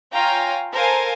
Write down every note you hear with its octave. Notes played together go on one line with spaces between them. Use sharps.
F4 C#5 F5 G5 G#5 A#5
A4 A#4 C5 F5 G#5